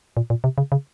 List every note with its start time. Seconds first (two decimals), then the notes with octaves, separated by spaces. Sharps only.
0.17 A#2
0.30 A#2
0.44 C3
0.58 C#3
0.72 C#3